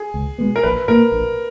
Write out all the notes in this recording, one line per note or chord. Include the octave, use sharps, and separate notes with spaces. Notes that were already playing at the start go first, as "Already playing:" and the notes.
Already playing: G#4
C#2
B2 G#3 B3
A#4
A#1 B4
A#2 A#3 A#4
A#1